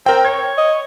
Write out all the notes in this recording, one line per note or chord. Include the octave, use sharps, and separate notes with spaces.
C4 A#4 G5
C#5 G#6
D#5